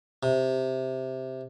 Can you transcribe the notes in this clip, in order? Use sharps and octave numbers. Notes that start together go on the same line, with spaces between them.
C3